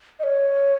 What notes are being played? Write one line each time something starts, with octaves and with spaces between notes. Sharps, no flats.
D#5
C#5